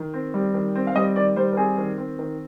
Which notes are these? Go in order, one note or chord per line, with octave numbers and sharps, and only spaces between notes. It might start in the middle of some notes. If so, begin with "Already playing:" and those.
Already playing: D#3
C4
G3
D#3
C4
F5
G3 D#5
D#3 D5
G3 C5
A#4
C4 G#4
D#3
C4
D#3